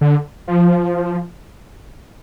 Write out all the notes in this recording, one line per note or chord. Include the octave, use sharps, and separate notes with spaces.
D3
F3